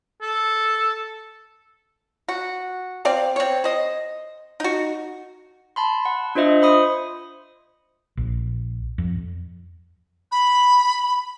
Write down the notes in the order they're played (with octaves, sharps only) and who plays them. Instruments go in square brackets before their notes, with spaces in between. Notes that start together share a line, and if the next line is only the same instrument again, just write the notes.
[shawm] A4
[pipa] F#4
C4 D5 F5
C4 C#5
C5 D#5
D#4 F#4
[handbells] A5 B5 C6
F#5
D4 F4 C5 D#5 E5 C6
C5 B5 D#6
[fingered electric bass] A#1
F2
[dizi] B5